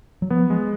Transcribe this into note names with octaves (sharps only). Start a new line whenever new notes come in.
F#3
F3 B3
G#3